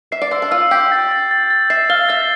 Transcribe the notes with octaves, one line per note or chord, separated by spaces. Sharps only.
E5 C7
D5
C5 E6
D4
F4 E6
G4 G6
A6
A6
A6
A6
E5 C7
F5 G7
E5 A6